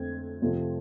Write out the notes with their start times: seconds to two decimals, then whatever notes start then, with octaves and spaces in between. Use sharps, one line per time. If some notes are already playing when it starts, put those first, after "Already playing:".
Already playing: F2 D3 A3 C4 G#6
0.42 F2 C3 F3 A3 C4